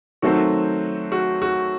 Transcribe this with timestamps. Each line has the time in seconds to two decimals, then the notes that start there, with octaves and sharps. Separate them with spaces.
0.22 D#3 F#3 A3 C4 F#4
1.12 F#4
1.42 F#4